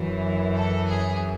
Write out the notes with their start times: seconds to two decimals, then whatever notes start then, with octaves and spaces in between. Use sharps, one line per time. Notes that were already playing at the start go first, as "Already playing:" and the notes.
Already playing: F#2 E3
0.55 A4
0.88 G#4